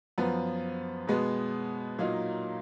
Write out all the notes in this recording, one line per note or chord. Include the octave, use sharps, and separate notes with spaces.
F#2 F3 B3
B2 G#3 B3
A#2 F#3 A#3 D#4